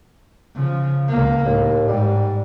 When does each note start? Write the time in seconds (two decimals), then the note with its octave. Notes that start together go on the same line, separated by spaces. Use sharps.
0.55 C#3 F3
1.08 C#2 A#3
1.46 D#2 A2
1.89 G#2 G3